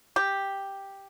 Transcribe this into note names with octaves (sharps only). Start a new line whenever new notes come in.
G4